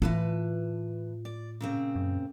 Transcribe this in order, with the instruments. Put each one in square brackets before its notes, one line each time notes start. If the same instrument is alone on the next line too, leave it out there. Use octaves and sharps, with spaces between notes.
[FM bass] A2 [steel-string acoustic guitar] E3 B4 A5 [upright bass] F4
[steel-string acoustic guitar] D5
A#2 C#3 C4
[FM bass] F#2